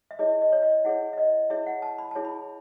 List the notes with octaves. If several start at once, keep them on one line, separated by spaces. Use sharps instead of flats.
E5
E4 G#4 C#5 D#5
D#5
C#5
D#5
E4 G#4 C#5 F#5
E5
D#5
E4 G#4 C#5 E5
F#5
A5
B5
E4 G#4 C#5 A5
B5